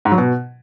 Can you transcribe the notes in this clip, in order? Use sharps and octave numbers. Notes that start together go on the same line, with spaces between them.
G#2
F#3
B2